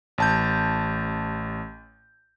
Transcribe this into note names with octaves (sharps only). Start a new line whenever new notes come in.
A1 A5 G6